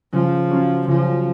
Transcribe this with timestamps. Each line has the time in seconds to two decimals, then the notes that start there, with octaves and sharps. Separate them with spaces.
0.13 C#3 F3
0.51 F#3 C#4 F4
0.88 C#3 F3